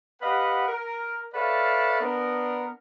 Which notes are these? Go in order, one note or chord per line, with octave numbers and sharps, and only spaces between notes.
G4 B4 D#5 F5 F#5
A#4
A4 B4 C#5 D5 E5 F5
B3 D4 A#4